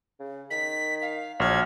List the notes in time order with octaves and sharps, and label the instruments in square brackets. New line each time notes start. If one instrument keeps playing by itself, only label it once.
[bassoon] C#3
[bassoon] D#3 [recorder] B6
[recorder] F5
[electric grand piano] A#1 F6 [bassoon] F#3 [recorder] G#6